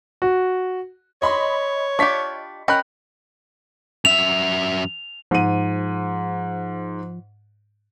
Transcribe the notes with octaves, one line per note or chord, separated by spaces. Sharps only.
F#4
C#5 D#5 B5 C6
D4 F4 G4 C#6 B6
C#4 A#4 D#5 G5 B5 F#6
F#2 E5 F7
G#2 F3 D#7